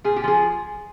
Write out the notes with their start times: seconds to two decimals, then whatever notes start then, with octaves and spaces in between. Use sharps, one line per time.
0.04 A#2 G#4
0.16 G4
0.24 F3 G#4